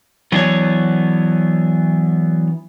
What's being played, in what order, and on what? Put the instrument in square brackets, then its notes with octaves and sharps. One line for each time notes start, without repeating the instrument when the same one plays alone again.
[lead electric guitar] E3 B3 [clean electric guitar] F#3 D4 C#5